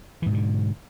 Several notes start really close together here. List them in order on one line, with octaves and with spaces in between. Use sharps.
E3 G#2 B2 D3